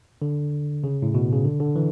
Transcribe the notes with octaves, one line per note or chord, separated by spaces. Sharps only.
D3
C#3
A2
B2
C#3
D3
D3
E3